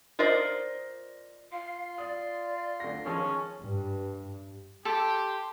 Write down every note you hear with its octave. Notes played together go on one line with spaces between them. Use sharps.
F4 A#4 C5 D5 D#5
F4 F5 C6
D5 D#6
D2 A#6
D#3 F3 G#3 C#4 C#5
G2
G4 A4 C6